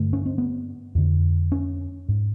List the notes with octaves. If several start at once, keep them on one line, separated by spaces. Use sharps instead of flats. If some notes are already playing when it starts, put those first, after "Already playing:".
Already playing: G2 D3 A3
C#4
C4
B3
F2 D3
C#4
G#2